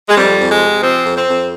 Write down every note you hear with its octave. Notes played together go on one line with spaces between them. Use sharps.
G#3
F2 G3
F2
G#3
C3
F3 C4
F2
C4
F2